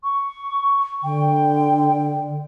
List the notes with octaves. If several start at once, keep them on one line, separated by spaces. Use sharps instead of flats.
C#6
D3 G5